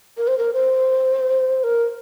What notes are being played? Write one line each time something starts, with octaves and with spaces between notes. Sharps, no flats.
A#4
C5
A#4
C5
A#4